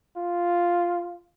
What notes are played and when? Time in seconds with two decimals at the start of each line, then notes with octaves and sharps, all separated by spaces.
0.16 F4